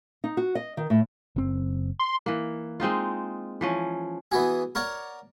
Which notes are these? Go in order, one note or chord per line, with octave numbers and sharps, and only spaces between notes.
D#4
F#4
D#5
D#3
A2
F#1 C4
C6
E3 A#3
G#3 C4 D#4 F4
E3 F3 C#4
E3 B3 F#4 G#4
A#4 C#5 D5 F#5